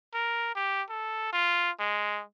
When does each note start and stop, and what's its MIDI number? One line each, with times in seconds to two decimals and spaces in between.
0.14 0.54 70
0.55 0.82 67
0.89 1.28 69
1.33 1.70 65
1.79 2.22 56